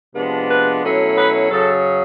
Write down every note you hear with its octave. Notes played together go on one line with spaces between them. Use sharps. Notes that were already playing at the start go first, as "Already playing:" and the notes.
C3 F3 G#3 B3 D4
B4
B2 F#3 A3 C#4 E4
B4
F#2 C#3 F#3 A4